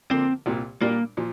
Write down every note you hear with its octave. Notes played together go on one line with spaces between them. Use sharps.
D3 F3 A#3 C4
C2 A#2 A#3
A#2 G3 A#3 D4 A#4
A#2 F3